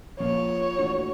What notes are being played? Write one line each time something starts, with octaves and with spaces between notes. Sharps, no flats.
A#2 F3 A#3 C#4 F4 C#5
E3 A3 D4 F#4